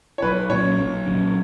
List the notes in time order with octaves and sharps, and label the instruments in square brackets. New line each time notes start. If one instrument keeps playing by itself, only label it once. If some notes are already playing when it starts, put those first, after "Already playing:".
[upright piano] C#5
[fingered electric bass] B1 [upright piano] B4
[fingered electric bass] A#2 F#3 C#4 [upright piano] C#5
[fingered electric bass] B1
A#2 F#3 C#4